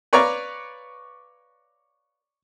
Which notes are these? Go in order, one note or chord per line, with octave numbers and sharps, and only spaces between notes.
B4 C#5 D5 F5 A#5 C#6